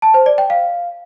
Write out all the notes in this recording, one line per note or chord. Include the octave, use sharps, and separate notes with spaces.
A5
C5
D5
G5
F5